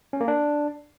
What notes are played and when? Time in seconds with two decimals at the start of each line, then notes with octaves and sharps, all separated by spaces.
0.13 C#4
0.21 A#3
0.28 D4